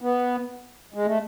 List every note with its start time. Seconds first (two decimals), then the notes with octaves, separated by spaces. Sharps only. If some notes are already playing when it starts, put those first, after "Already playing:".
0.01 B3
0.94 G#3
1.06 A3